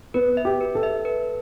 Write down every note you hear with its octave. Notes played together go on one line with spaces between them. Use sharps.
B3 B4
E5
G4
B4
A4
E5
B4